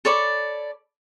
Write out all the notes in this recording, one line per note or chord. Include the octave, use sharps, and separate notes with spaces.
A4 C#5 D5 B5